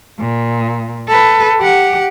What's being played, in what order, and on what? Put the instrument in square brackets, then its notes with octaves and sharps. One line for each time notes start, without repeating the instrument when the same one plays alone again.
[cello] A#2
A4 B4
G4 F#5